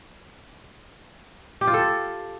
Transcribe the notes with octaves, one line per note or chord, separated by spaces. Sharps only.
G4
F4
A4